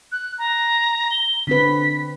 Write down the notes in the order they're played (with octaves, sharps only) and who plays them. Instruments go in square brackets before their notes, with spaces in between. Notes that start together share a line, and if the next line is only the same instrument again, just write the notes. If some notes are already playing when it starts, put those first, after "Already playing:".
[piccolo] F#6
A#5
G7
[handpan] D3 C4 B4 [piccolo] B6